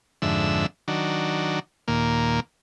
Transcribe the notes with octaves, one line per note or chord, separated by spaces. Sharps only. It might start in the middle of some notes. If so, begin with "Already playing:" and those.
F2 G#2 D3 E5
D#3 F#3 D4
D#2 A#2 A#3